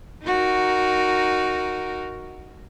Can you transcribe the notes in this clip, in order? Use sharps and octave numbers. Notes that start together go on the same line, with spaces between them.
D#4 F#4 A#4